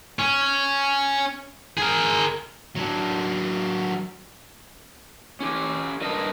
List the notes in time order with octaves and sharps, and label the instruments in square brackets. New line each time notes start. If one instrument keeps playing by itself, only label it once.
[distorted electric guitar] C#4
G#4 A#4
F#3 D4
[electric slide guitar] C#4 G4
G2 A4 A#4 D#5 A5